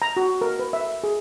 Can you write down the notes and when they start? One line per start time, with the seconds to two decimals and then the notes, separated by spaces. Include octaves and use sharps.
0.02 A#5
0.17 F#4
0.41 A#4
0.59 B4
0.73 E5
1.04 G#4